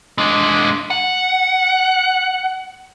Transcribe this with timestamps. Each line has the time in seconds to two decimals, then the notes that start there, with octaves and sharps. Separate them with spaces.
0.18 G#3 D4
0.90 F#5